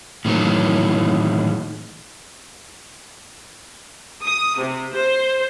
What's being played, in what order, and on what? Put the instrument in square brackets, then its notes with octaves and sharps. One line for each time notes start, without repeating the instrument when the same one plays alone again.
[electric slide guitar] A2 D#3 E3 F#3
[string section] D#6
C3
C5